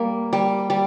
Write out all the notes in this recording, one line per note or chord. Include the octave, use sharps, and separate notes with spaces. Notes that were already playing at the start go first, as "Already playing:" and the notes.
Already playing: G3 A#3
G3
G3